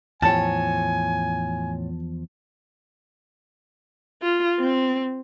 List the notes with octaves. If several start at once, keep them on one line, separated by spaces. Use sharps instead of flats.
E2 A2 F3 C#5 G#5 A5
F4
C4